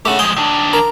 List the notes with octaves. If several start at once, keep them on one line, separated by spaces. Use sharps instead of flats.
C#3 A3 G4 F#5
F3 G#3 G5
D#3 D4
A#4